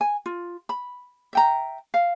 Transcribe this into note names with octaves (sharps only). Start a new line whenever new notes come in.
G#5
F4
B5
E5 G5 A#5
F5